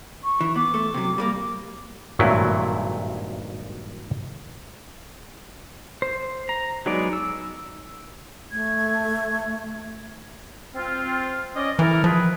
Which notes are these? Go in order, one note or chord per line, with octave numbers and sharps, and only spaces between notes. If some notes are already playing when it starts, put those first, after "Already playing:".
C#6
E3
B3 D6
A3
C3 F#3
G3 G#3 A#3
G#1 G2 A#2 F#3 A3 E4
C5
A#5
F#3 G#3 B3 D#4 D5
E6
A3 G#6
C4 F4
C#4 D5 D#5
E3 E4 A4 A#4
D#3 F3 G#4 B4